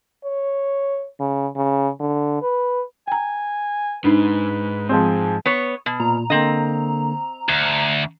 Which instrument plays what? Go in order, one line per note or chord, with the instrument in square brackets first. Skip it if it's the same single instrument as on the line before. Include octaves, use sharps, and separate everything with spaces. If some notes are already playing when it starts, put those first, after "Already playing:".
[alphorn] C#5
C#3
C#3
D3
B4
[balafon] G5 A#5 [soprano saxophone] G#5
[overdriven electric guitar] G#2 [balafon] D4 D#4 [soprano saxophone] B4
[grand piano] F3 G#3 C4 [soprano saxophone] G#5
[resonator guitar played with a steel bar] B3 C#5
B2
[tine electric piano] A#2 [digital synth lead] A#5
[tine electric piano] D3 A#3 [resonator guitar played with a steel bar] C4 D#5
[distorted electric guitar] D2 [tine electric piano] G#6